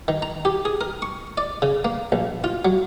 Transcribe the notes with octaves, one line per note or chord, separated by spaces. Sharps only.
D#3
A#5
G4
G#4
A#4
C#6
D5
C#3
A#3
A#1
F4
F#3